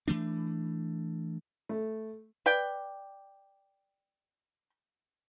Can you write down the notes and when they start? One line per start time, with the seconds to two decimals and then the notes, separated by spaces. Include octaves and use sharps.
0.08 E3 F3 A3 D4
1.69 A3
2.46 B4 D5 G5